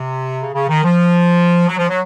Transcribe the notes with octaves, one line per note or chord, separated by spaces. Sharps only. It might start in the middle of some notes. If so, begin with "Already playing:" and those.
Already playing: C3
C#3
C#3
D#3
F3
F#3
F3
F#3